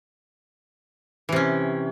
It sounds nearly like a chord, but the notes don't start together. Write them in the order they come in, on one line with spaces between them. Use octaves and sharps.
E3 C3 C#4